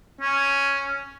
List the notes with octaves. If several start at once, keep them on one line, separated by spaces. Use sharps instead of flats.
C#4